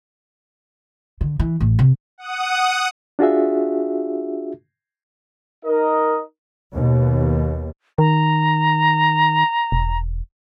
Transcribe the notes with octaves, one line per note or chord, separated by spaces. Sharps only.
D3
E3
A1
C3
F#5 D#6
D4 F4 F#4 G#4 E5
D#4 A#4 D#5
D#2 B2
D#3 A#5
E1